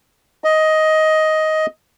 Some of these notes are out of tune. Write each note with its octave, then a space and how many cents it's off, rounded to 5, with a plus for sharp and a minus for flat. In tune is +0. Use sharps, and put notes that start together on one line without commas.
D#5 +10